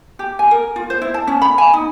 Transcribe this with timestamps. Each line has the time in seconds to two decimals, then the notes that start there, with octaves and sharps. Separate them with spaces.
0.19 G4
0.39 G#5
0.51 A#4
0.76 F4
0.90 C5
1.02 E4
1.14 A5
1.27 C#4
1.42 B5
1.58 G#5
1.73 D#4